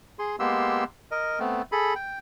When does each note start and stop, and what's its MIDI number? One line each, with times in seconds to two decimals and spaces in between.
0.19 0.36 68
0.19 0.36 84
0.39 0.84 56
0.39 0.84 58
0.39 0.84 59
0.39 0.84 67
0.39 0.84 84
0.39 0.84 88
1.11 1.39 70
1.11 1.39 75
1.40 1.62 57
1.40 1.62 59
1.40 1.62 60
1.72 1.94 68
1.72 1.94 69
1.72 1.94 83
1.95 2.19 79